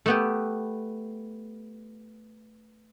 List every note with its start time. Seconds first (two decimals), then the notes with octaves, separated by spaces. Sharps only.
0.06 A3 B3 G4